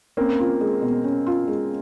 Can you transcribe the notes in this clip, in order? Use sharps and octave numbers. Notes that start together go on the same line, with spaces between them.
A#3 C4 C#4
F4
G#3
B2
C#4
F4
G#3